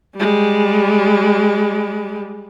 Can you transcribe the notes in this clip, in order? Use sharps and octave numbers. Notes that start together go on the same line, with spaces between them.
G3 G#3